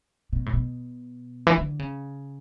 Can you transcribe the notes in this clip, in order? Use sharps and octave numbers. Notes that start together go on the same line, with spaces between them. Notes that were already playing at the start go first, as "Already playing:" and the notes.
B2
A2
B2
E3
D3
C#3